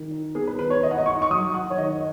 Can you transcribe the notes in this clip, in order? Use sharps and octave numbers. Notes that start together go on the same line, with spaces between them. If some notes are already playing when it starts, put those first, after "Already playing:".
Already playing: D#3
D#4
B3 G#4
B4
D#3 B4
C#5
D#3 D#5
F#5
D#5
D#4 C#6
C#6
F#3 D#6
D#4 F#5
C#5
D#3 D#5